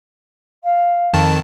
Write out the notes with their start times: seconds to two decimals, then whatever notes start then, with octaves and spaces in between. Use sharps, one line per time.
0.63 F5
1.14 F2 D#3 A5